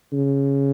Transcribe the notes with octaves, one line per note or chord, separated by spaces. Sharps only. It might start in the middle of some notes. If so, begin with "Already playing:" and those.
C#3